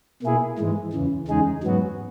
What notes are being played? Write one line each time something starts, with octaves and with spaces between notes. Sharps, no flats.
B2 A#3 E4 G#4
G#2 E3 G#3
E2 C#3 E3
E2 C#3 G#3 D#4 G#4
G#2 F#3 B3 F#4